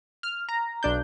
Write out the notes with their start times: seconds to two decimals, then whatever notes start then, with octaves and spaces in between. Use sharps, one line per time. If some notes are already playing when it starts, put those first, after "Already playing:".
0.23 F6
0.49 A#5
0.83 B1 D4 G6